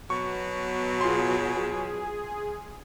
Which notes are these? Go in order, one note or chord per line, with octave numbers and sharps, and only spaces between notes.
B2 F#3 C#6
F4 G#4 C6